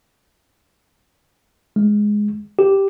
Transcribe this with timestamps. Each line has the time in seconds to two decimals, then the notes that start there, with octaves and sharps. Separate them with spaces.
1.76 G#3
2.59 G4